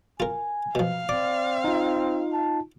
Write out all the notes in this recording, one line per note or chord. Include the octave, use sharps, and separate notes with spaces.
F4 A#4 G#5
B2 F3 F5
C4 D5 D6
D#4 F4
A5